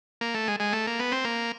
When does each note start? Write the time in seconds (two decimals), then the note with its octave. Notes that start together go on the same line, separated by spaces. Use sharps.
0.21 A#3
0.34 A3
0.48 G#3
0.60 G#3
0.73 A3
0.87 A#3
0.99 B3
1.12 C4
1.25 A#3